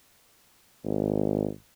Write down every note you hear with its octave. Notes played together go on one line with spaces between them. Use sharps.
G#1